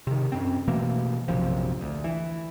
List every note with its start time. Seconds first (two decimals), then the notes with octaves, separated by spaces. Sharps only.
0.07 C3 D#3
0.32 F#2 C4
0.68 B2 E3 A3 A#3
1.28 A#1 F#2 C3 F3
1.81 D2
2.04 E3